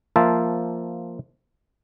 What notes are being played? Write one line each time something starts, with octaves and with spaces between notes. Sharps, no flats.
F3 A#3 F4 C5 E5 A5